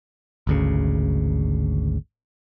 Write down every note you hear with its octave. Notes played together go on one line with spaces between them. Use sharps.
G#1 D2 C#3